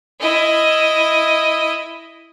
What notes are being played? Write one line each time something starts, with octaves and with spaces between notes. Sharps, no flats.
E4 D#5